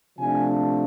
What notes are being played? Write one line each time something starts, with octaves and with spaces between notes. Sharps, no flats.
C3 F3 A3 D4 G#5